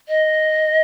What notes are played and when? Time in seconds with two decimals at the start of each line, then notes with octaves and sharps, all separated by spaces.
0.09 D#5